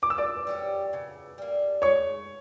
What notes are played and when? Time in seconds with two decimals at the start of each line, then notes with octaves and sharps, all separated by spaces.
0.02 A#2 D6
0.10 E6
0.18 D5 D6
0.47 G3 C#4 G4
0.93 C#3
1.38 G3 A#3
1.82 C#3 C#5 C#6